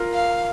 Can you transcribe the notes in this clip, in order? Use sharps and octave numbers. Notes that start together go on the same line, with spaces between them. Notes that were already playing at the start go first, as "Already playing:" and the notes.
Already playing: F4 A#4
F5